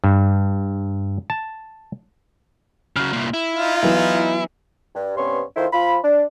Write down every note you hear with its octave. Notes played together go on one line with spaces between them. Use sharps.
G2
A5
C#3 F#3 F6
C2 A#2
E4
D#4 F4
E3 F#3 B3
G2
G2 C3 B3 C#4 C6 C#6
D#3 E4 F4 A4 C5
F3 F4 B5
D4